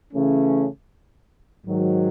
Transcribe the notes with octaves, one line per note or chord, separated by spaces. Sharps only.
C#3 E3 A3 C#4
G#2 D#3 F#3